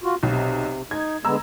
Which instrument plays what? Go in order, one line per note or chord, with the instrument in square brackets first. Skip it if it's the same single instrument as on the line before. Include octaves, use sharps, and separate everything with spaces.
[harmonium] F4 F#4
[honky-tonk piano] B1 [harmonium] C3
[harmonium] D#4 [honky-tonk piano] G#6
[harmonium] D3 G#3 B3 [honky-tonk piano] A#5 E6